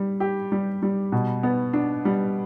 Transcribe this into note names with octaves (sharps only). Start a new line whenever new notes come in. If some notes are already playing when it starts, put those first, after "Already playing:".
Already playing: G3
G4
G3
G3
B2
B3
D4
G3